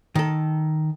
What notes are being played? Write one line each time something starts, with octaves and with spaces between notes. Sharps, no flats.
D#3 A4